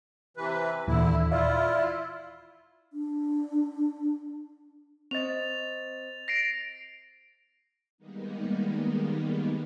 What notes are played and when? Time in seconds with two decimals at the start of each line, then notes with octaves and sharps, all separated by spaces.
0.37 C3 E3 B4
0.87 D#2 A#2 D3 E3 E4
1.31 E4 F4 D5 E5 F5
2.93 D4
5.11 C4 C5 D#5 A6 F7
6.28 A#6 C7 D7
7.98 D#3 G3 G#3 A#3 B3 D#4